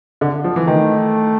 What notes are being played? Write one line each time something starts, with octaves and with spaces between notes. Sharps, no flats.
D3
F3
E3
D#3 A3